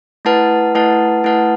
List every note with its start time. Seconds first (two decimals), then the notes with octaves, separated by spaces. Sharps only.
0.25 A3 E4 B4 F#5 A5
0.75 A3 E4 B4 F#5 A5
1.24 A3 E4 B4 F#5 A5